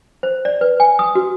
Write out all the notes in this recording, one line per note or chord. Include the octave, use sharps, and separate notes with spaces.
C5
D5
B4
G#5
D#6
F#4